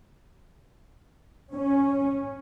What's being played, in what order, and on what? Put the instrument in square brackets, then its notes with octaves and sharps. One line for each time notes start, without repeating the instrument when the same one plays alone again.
[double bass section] C#4